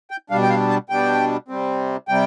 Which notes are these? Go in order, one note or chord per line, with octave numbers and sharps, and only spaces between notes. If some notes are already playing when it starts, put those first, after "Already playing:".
G5
B2 G3 D4 F5
G5
F5
A5
B2 G3 D4 G5
C3 G3 C4
C3 G3 G5